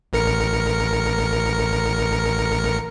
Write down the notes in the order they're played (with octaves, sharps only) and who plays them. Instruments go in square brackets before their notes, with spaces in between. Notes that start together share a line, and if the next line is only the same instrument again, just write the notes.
[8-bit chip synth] A1 A#4 C#7